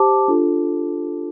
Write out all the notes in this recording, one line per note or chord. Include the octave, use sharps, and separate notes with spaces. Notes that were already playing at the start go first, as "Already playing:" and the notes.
Already playing: G4 C5 A5 D6
D4 F4 A4